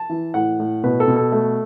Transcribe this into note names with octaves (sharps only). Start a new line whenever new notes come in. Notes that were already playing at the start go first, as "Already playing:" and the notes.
Already playing: A5
E3
A2 F#5
A2
B2 B4
A4
B2
A4
A3